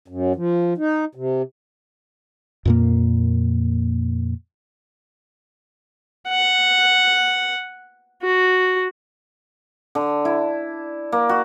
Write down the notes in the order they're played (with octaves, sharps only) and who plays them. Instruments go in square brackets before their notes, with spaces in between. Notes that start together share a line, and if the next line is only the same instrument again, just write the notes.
[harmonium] F#2
F3
D#4
C3
[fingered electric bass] F2 A#2 A#3
[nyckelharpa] F#5
F#4
[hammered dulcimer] D3
E4
A#3
F#4